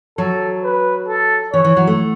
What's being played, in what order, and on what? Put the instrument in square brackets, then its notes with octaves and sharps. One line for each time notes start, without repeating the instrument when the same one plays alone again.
[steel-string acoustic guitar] F#3 [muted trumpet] A4
[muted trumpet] B4
A4
[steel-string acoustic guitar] E3 [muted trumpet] C#5
[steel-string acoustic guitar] E3
F#3
A3